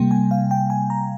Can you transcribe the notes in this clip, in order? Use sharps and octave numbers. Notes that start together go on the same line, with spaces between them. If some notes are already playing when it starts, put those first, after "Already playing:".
Already playing: C3 G3 A#3 G5
G#5
F5
G5
G#5
A#5